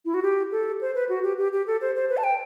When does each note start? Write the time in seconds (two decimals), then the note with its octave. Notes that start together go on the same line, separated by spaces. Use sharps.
0.05 E4
0.14 F#4
0.23 G4
0.52 A4
0.81 C5
0.95 B4
1.09 F#4
1.23 G4
1.38 G4
1.53 G4
1.67 A4
1.81 C5
1.96 C5
2.10 B4
2.17 A5
2.24 G5